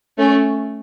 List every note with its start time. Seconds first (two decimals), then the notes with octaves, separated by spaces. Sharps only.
0.18 A3 C#4